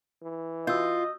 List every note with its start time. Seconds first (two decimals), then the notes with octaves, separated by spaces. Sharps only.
0.23 E3
0.67 F4 F#4 D#5 E6 G6